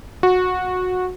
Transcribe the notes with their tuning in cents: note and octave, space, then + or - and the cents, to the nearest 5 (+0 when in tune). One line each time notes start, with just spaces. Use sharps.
F#4 -15